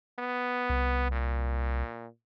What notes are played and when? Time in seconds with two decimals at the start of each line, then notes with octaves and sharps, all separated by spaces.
0.19 B3
0.70 C2
1.12 A#2